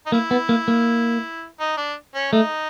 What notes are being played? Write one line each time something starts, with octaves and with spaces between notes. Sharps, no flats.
D#4
A#3 E4
B3
A#3
A#3
D#4
D4
C#4
A3 D#4